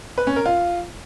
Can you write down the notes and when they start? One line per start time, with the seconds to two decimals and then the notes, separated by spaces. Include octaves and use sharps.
0.18 B4
0.27 C#4
0.36 A#4
0.46 F4